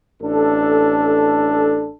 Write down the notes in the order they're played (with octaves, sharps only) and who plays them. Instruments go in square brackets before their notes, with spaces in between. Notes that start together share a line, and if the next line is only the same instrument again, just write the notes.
[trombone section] A1 D4 A4